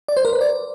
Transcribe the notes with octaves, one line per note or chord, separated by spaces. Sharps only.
D5
C5
A#4
B4
D5